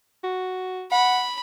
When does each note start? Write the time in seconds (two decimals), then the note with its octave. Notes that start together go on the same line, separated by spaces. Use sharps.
0.24 F#4
0.91 F#5 B5